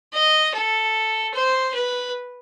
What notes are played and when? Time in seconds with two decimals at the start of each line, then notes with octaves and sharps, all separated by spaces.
0.13 D#5
0.54 A4
1.34 C5
1.74 B4